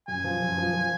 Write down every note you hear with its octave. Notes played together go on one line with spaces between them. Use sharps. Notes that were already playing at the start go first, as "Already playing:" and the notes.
F#2 G#5
F3
F#2
F3
F3